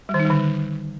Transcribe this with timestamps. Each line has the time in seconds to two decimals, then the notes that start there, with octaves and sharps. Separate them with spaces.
0.09 G3
0.14 D#3
0.20 D#4
0.25 G3
0.30 D3